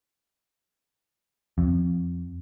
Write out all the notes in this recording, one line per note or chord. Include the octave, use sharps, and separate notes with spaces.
F2